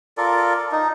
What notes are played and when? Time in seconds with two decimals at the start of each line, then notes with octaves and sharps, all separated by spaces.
0.18 F4 A4 A#4 D5
0.72 D#4